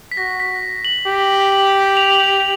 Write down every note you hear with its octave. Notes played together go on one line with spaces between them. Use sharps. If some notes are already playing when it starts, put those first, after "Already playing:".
B6
F#4 A#6
B6
F#7
G4
F#7
F7
F#7
F7